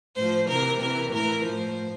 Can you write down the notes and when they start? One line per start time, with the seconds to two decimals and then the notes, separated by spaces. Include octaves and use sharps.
0.16 A2 F3 C5
0.48 C3 E3 A#4
0.81 C3 E3 A#4
1.13 A2 E3 A#4
1.45 A2 F3 C5